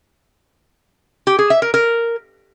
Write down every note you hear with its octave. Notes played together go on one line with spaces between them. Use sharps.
G4
G#4
E5
A#4
A#4